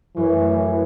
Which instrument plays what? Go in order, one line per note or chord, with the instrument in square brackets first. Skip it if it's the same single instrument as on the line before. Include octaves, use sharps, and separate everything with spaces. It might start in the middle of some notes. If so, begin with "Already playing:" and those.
[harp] F#2 [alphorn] E3
[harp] A3